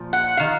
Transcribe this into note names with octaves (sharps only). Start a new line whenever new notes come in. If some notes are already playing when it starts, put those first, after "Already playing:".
Already playing: A#2 F3
F#5
D#3 F5